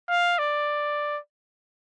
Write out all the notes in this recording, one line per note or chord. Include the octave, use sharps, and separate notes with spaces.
F5
D5